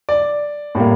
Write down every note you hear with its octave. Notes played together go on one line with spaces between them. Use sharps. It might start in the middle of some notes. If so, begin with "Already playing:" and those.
D5
A2 G3 A#3